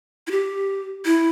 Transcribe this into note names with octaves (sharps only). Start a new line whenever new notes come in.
E4
G4
E4